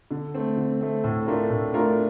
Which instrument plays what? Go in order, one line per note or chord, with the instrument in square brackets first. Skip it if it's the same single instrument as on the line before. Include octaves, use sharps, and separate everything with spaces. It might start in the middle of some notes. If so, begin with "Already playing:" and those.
[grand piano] D3
A3 C4
D3
A3 C4
A2
A3 D4 F4 A#4
A2
A3 D4 F4 A#4